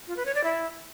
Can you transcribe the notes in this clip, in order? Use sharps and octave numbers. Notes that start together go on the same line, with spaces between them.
F4
B4
C#5
D5
E4